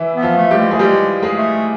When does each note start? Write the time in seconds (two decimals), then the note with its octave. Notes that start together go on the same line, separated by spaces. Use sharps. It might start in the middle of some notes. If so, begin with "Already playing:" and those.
Already playing: E3 E4
0.15 B3
0.22 F3 F4
0.37 A3
0.51 G3 G4
0.58 G#3
0.71 A3 G#4
0.79 G3 G#3 G4
1.22 G#3 G#4
1.37 A3